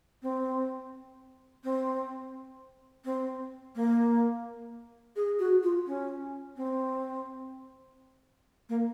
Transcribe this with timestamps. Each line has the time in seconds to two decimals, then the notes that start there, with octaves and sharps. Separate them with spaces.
0.22 C4
1.64 C4
3.05 C4
3.75 A#3
5.16 G#4
5.39 F#4
5.63 F4
5.86 C#4
6.56 C4
8.69 A#3